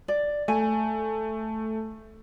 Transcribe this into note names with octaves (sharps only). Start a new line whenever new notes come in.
D5
A3 G#5